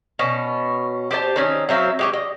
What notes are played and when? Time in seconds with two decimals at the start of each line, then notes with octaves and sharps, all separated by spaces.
0.19 B2 C#4
1.11 G4 C5 D#5 A5
1.36 D#3 C4 C#4
1.69 F#3 C4 E5 F5
1.99 G#3 G4 C#5
2.13 D#5